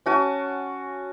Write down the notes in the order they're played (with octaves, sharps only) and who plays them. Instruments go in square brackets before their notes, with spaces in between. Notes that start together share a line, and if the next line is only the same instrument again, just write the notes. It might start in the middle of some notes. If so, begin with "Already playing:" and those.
[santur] C#4 F#4 G#5 A5